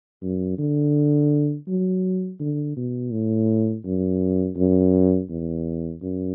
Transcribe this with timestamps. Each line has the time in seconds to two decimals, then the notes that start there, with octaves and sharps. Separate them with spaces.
0.22 F#2
0.58 D3
1.68 F#3
2.40 D3
2.77 B2
3.12 A2
3.85 F#2
4.57 F#2
5.29 E2
6.02 F#2